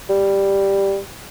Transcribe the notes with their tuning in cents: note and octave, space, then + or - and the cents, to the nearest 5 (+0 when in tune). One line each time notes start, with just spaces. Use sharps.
G3 +5